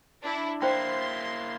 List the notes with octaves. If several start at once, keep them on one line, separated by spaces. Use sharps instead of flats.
D4 E4
A#3 E4 C5 G5 C6